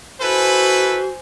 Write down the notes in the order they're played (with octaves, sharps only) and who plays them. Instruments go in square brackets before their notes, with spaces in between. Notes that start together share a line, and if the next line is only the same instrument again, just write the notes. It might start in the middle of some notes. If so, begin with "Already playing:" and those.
[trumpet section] E4 A4 B4 [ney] F#4 [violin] C5 G#5